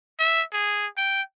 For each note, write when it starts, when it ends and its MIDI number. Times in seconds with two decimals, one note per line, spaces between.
0.19 0.42 76
0.53 0.87 68
0.97 1.22 79